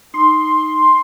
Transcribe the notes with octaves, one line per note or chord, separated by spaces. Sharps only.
D#4 C6